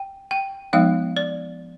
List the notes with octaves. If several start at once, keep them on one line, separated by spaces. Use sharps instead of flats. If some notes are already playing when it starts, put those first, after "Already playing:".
Already playing: G5
G5
F3 G#3 B3 D#4 F5
D5